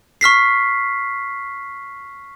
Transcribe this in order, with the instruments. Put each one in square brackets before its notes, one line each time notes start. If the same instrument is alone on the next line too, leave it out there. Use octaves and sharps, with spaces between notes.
[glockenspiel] C#6 F6 B6 C7